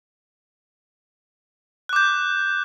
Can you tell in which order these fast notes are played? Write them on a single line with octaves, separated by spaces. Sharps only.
F#6 D6 G6